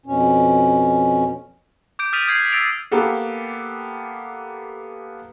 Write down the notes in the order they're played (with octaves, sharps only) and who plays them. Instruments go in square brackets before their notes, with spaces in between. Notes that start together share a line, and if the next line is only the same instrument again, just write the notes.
[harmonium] F2 B2 C#4
[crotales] D6 G6 D7
D#6 F6 A6 B6 D#7 F7
D#6 G6 G#6 C7 D7
E6 A6 D7 F7
[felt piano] A#3 B3 G4 A4